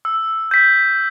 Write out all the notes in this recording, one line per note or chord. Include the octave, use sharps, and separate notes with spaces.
E6
G6 B6